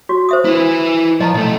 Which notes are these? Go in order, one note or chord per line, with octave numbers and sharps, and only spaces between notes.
F#4
C5 E5 D#6
E4 B4
F3 D#5 A5 A#5
B1 A3 D#5